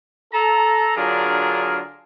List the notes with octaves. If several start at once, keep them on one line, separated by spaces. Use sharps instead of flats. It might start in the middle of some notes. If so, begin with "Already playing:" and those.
A4 A#5
D3 F#3 D4 F4 G#4 A#4